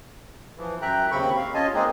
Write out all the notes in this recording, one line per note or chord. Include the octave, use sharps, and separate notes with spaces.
E3 F3
F#2 E5 G5 A#5 F#6
D#2 C#3 C4 B5 C#6
D#2 F5
C#4 F4 D#5 G#5 A5
G#3 A#3 C4 D#4 G#4